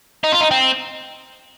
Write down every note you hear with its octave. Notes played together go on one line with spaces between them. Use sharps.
D#4
F4
D#4
C4